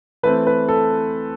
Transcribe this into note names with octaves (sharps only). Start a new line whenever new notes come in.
E3 A3 C4 B4
B4
A4